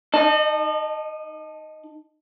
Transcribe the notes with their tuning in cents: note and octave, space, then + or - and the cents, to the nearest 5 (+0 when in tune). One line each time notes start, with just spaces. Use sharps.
D#4 +0 D#5 -40 A5 +0